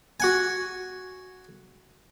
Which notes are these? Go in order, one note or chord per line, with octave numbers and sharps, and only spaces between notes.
F#4 F#5 G#5